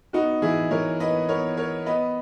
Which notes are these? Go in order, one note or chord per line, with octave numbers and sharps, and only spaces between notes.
B3 D#4 F#4
E3 E4 G#4
E3 A#4 C#5
B3 B4 D#5
B3 A#4 C#5
B3 A#4 C#5
B3 B4 D#5